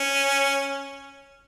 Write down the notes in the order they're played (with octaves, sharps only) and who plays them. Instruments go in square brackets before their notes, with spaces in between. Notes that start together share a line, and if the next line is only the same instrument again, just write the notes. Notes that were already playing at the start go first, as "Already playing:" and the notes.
Already playing: [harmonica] C#4